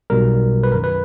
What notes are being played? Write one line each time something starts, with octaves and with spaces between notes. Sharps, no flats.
B1 B2 G3 A#4
B4
F#2 D#3 F#3 A#4
B4